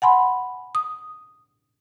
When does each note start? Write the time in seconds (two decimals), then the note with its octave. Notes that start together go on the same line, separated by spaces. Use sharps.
0.02 F#5 G#5 B5 C6
0.75 D#6